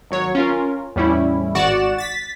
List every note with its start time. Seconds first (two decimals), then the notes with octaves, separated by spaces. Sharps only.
0.10 G#1 F#3 C#5
0.35 C#4 F4 A#4
0.96 E2 A2 G3 C#4 E4
1.55 G#1 F#4 D5 F#5 E7
1.98 A6 B6